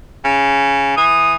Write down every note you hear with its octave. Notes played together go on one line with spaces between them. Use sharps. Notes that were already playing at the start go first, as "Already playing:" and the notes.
C#3
E3 D#6